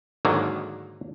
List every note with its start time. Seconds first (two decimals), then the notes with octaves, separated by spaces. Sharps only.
0.25 G#2 D3 D#3 F#3 A#3